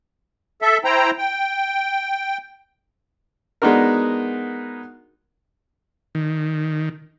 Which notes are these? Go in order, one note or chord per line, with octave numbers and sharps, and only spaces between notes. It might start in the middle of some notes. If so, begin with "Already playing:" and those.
A4 E5
E4 C5 G5 A#5
G5
G#3 B3 D4 D#4 F#4 A#4
D#3